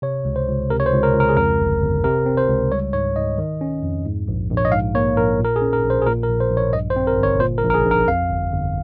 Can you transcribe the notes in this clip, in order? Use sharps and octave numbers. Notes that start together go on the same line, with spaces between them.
C3 C#5
C#2
C5
C#2
C3 A#4
C#5
C5
C#2
A#4
C#2
A#4
G#4
F2 A#4
G1
G1
C3 A#4
C4
C5
C#2
G3 C#5
G#2 C#5
G#2 D#5
D#3
C#4
F2
G#2
A#1
A#1
C#5
D#5
G#2 F5
A#3 C#5
A#1 A#4
A#2 A#4
G#4
C#4
A#4
A#1
C5
G#4
A#2 A#4
A#4
A#1
C5
A#1
C#5
G2 D#5
C5
C4
A#4
G1
C#5
A#2 C5
A#4
A#1
A#4
G#4
A#1
A#4
F2 F5
G1
G1